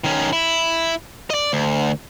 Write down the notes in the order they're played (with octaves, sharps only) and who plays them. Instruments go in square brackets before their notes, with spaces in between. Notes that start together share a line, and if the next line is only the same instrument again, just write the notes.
[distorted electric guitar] D#3 C#4
E4
D5 D#5
D2